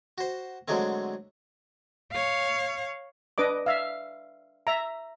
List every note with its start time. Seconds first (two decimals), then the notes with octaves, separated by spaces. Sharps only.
0.18 F#4 C5
0.68 D3 F#3 G#3 A3 C4
2.12 C#5 F5
3.38 D4 B4 D#5 D6
3.66 E5 F5
4.67 E5 A#5